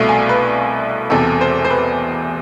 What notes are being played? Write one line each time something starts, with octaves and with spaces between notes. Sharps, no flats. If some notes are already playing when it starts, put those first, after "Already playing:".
Already playing: C2 B2 A3 F5
G#5
B4
E1 E2 C3 A4
C5
C5
B4